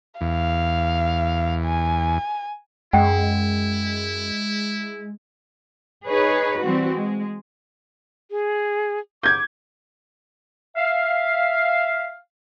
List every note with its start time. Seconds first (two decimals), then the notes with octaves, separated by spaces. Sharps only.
0.21 E2 F5
1.65 G#5
2.93 F#2 G#3 E4 F#5 G5
6.07 D#4 G#4 B4 C#5
6.60 E3 G3 C4 F#4
6.93 G#3
8.31 G#4
9.23 D6 G6 G#6
10.76 E5 F5